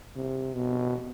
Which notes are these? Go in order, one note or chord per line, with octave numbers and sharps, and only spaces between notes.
C3
B2